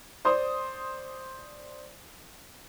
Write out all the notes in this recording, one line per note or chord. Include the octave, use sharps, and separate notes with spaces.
C5 D5 C6 D#6